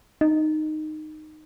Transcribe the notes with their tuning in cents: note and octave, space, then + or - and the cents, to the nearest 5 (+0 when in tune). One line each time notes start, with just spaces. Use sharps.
D#4 -10